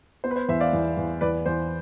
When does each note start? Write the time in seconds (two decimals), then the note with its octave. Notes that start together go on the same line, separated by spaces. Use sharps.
0.24 B3 C5
0.31 B4
0.36 C5
0.49 E2 C5 E5
0.60 D5 F5
0.73 E2
0.97 E2
1.21 E2 B4 D5
1.46 E2 C5